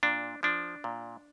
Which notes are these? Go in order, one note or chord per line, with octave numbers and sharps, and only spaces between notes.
A#2 D4
F3 D4
A#2